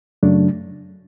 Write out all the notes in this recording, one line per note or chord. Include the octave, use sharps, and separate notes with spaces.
F#2 C#3 F#3 A3 D4